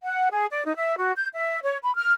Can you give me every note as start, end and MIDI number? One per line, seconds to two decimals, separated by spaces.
0.04 0.29 78
0.30 0.45 68
0.50 0.64 74
0.64 0.74 63
0.76 0.94 76
0.97 1.12 66
1.16 1.27 91
1.35 1.59 76
1.63 1.77 73
1.82 1.94 83
1.96 2.12 89